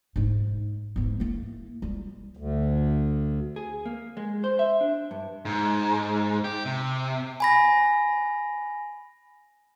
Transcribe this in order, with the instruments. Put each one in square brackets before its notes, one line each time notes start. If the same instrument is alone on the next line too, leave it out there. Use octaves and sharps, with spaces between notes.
[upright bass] G#2 D#4
G#2 B3
A#3 E4
G3 F4
[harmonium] D2
[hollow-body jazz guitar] G#4
A#3
G#3
C5
E5
D4
G2
[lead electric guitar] G#2
G4
C3
[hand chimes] G#5 B5 A#6